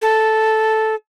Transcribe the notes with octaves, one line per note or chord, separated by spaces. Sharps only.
A4